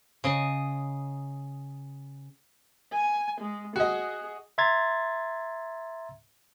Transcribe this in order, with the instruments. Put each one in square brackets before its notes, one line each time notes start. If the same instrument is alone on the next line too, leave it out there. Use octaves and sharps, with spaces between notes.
[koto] C#3 D#5
[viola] G#5
G#3
[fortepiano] F#4 D#5 [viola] G#4
[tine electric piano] E5 A#5 C6 G#6 A6